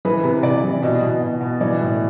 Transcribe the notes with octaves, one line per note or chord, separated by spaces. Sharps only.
E3 B4
C3
C3 D5
E3
B2 D#5
B2
B2
B2
E3 D5
A2